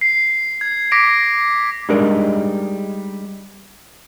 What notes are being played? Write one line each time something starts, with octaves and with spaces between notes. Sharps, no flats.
C7
G#6
D6 A#6 B6 D7
G3 G#3 D4 D#4 A#4 D5